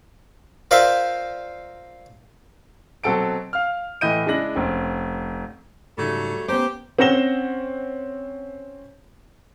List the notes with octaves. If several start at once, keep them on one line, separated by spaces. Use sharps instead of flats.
F4 A#4 C5 D5 E5 F5
B2 F#3 C4 A4 A5 D7
F5 F6
A2 E3 E4 D#5 G6 D#7
C#3 G#3 D4 E4 A#6 F#7
F1 C4 C#4
G#2 C#3 F#3 G3 A3 D#4
B3 C#4 G4 B4 C5 A#5
C4 C#4 F#5 A#6 E7 G7